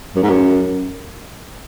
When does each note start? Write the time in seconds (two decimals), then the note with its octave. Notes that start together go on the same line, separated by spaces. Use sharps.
0.16 F#2
0.23 G#2
0.30 F#2